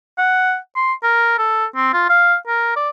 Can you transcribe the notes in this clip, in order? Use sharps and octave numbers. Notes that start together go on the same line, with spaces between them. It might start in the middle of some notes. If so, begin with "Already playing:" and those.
F#5
C6
A#4
A4
C4
F4
F5
A#4
D5